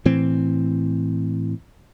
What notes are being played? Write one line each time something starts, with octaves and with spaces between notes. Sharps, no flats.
A2 E3 C4